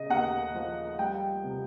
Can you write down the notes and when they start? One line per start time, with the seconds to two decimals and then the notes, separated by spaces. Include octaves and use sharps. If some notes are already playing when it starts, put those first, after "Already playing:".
Already playing: C#3 D#5
0.10 D#2 F#5
0.54 F3
0.98 G3 G5
1.44 C3